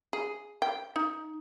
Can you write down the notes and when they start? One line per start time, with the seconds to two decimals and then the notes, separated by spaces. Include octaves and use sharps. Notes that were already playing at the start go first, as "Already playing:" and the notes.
0.13 G#4
0.62 G5
0.96 D#4